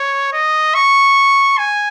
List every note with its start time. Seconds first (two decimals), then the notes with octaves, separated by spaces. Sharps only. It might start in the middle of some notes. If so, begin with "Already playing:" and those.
Already playing: C#5
0.33 D#5
0.75 C#6
1.58 G#5